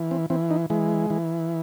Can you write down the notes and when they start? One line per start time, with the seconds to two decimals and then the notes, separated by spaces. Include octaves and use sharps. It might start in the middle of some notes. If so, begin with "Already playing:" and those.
Already playing: E3
0.11 C4
0.30 E3 C4
0.51 D#4
0.70 E3 G#3
1.10 E3